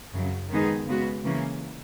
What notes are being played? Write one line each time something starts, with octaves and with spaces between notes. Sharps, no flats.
F#2 C#3 F#3
D#3 G#3 B3 D#4 G#4
C#3 G#3 B3 F#4
C#3 E3 A#3 C#4